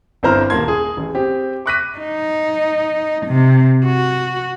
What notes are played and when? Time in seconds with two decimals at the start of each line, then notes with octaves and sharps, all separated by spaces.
0.23 G1 C4 E4 C5 A#5 F6
0.50 D#1 A#3 A5 C6 G#6
0.68 G#4
0.97 A1
1.15 C4 G4
1.66 C#6 D6 F#6 A#6 B6 D#7
1.98 D#4
3.26 C3
3.85 F#4